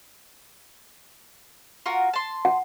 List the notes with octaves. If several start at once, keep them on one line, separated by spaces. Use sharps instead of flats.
F4 F#4 A#4
A5 C6
F#5